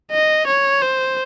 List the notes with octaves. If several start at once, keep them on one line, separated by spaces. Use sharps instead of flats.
D#5
C#5
C5